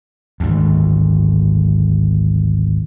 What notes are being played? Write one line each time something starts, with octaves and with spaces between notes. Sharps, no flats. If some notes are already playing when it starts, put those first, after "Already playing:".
G#1 D2